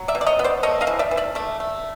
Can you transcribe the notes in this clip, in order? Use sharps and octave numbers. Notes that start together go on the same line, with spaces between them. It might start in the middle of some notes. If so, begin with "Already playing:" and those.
Already playing: F#3
D5 E5
B2
D5
C#5 D#5
B3
C5 D5
A3 C#5 D#5
D#5 F5
E3
D5 E5
E3
D5 E5
A3 D5 E5
A3